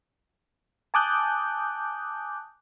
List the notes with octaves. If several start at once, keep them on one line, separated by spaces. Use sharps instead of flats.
G#5 A5 D6 D#6 F#6 G6